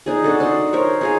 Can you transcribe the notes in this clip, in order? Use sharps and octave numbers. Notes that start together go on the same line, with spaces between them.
D4 D#4 G#4
D4 F#4 A4
D4 D#4 C6
A#4 C5 C#5
D#4 G#4 F5